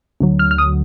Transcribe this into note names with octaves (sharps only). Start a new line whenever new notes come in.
D2 D3 F#3
F6
F6
D#6